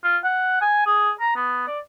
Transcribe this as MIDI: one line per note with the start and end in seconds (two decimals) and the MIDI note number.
0.04 0.17 65
0.24 0.61 78
0.61 0.86 80
0.86 1.12 68
1.21 1.35 82
1.36 1.67 59
1.67 1.80 74